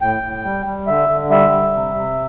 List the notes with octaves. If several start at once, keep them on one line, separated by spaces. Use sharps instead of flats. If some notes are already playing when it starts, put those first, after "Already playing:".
A2 G5
A2
G3
G3
D3 E5
D3
G3 E5
G3
C3
C3